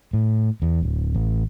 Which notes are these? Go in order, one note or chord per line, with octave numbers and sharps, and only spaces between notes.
A2
E2
D1
A1